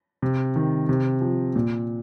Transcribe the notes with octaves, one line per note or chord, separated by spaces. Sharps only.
C3
D#3
C3
F3
A#2